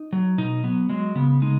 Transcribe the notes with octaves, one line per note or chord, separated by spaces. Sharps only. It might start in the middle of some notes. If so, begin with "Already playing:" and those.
Already playing: D#4
F#3
B2 D#4
F#3 B3
F#3 G#3
C#3 B3
G#3 D#4